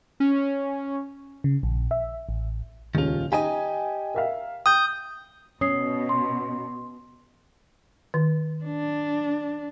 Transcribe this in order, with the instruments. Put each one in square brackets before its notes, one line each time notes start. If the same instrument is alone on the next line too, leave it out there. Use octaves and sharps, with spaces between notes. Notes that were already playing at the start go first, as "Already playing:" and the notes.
[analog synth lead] C#4
[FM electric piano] C#3
A#1
E5
A1
[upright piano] D#1 C#2 F7 [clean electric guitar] D#3 F4
[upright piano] D#4 G#5 D#7 [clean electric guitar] G4 D#5
[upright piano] A#4 E5 F5
[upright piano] G5 [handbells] D#6 G6
[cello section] B2 [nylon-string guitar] C#4 [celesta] D#6 C7
[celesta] C6
[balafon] D#3
[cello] D4